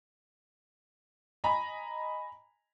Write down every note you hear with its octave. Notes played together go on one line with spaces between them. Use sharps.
D#5 G#5 A#5 B5